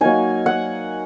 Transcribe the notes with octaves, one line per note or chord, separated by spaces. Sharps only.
F#3 A#3 D#4 G#5
F#5